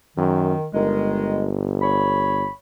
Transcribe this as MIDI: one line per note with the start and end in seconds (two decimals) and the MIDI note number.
0.17 0.54 42
0.17 0.67 51
0.74 2.47 31
0.74 1.48 51
0.74 1.48 56
1.82 2.52 73
1.82 2.52 83